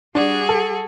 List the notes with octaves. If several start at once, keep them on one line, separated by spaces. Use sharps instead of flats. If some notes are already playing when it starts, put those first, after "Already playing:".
G3 D4 F#4 G#4
A4